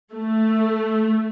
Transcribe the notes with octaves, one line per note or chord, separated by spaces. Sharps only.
A3